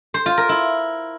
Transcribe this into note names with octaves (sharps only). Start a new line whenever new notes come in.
C5
F4
A#4
E4